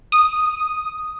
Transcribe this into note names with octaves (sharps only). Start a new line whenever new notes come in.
D#6